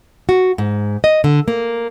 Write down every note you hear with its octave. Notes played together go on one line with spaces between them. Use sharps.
F#4
G#2
D#5
D3
A#3